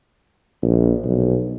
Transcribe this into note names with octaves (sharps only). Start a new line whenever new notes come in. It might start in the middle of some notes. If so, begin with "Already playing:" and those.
A#1
B1